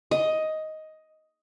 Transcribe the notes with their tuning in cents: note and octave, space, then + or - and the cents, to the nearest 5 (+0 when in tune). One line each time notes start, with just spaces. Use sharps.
D#5 +10